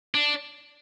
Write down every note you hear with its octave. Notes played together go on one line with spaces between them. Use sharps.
D4